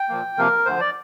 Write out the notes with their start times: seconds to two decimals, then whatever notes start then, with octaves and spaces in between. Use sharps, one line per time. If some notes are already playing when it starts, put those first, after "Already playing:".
Already playing: G5
0.09 A#2 F3 A#3
0.37 C3 F3 A#3 A#4
0.66 D2 D3 F3 C5
0.80 D5